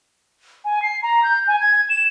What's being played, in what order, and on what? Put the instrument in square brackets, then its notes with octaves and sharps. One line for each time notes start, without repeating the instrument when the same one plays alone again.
[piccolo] G#5
C7
A#5
G6
G#5
G#6
E7